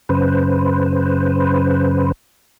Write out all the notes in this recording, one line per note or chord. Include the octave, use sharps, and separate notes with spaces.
F#2 C#3 B4 C5